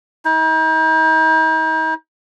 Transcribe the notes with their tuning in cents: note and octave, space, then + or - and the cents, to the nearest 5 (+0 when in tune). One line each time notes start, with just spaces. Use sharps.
D#4 +40